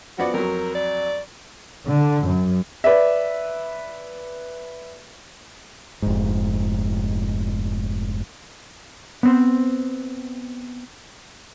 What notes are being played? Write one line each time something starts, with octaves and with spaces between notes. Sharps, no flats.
F3 B3 F#4 D5
F2 F#3 A#4
D5
D3
F#2
B4 D5 E5
F1 G#2
B3 C4 C5